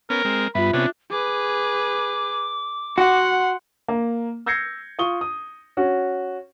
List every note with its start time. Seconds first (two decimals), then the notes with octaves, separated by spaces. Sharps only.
0.10 B3 C#4 A#4
0.25 G#3 C4
0.55 G2 B3 F4 E5 B5
0.73 C3 B3 C#4 D4
1.10 G#4 B4 D6
2.98 F#4 F#5 C6
3.88 A#3
4.46 E6 G6 G#6 A#6 C7 C#7
4.98 F4 C#6 D#6 G7
5.21 D#6
5.77 C#4 F#4